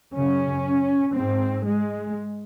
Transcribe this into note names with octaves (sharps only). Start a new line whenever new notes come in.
F#2 C#3 C#4
G#2 C4
G#3